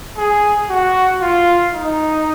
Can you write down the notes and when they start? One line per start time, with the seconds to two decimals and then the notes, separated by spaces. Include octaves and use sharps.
0.17 G#4
0.70 F#4
1.21 F4
1.73 D#4